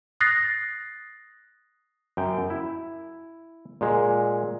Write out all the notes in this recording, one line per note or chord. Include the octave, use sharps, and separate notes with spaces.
D#6 F#6 A6 A#6 C7
F#2 G5
E4
A#2 G#3